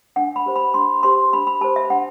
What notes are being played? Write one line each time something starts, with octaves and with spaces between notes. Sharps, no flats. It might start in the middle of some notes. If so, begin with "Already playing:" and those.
D4 F#5
B5
G4 C5
B5
D4 C6
G4 C5 C6
D4 B5
B5
G4 C5 A5
E5
D4 F#5